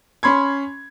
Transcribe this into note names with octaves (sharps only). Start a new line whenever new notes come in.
C#4 B5 C6 G#6